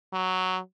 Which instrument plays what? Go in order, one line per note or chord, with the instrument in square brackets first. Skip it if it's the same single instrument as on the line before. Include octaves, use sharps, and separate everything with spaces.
[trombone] F#3